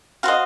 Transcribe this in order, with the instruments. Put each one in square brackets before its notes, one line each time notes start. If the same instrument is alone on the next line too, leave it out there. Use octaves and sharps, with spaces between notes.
[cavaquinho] F#4 C5 D#5 F5